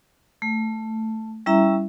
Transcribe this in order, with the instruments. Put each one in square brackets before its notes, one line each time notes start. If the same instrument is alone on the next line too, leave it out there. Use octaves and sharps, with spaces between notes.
[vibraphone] A3
G3 C#4 E4 E5 A#5